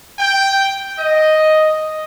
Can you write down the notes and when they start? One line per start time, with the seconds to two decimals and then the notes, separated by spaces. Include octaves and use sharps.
0.19 G5
0.99 D#5